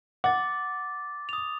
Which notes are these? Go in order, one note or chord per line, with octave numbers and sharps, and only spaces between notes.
F#5 D6 A6
D#6 F7